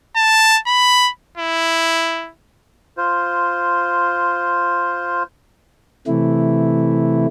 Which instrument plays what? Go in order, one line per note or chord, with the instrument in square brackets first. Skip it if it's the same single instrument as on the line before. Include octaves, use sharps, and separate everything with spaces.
[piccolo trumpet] A5
B5
E4
[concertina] F4 C5
[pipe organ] C3 E3 A3 E4